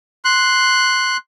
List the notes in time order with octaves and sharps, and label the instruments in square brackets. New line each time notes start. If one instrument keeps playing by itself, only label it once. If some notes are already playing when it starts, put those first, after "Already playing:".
[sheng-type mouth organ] C6 F#6